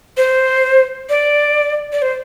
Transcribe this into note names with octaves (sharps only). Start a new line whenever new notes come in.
C5
D5
D5
C5